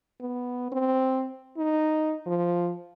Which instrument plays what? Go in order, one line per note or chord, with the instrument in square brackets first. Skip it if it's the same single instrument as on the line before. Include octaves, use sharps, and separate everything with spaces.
[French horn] B3
C4
D#4
F3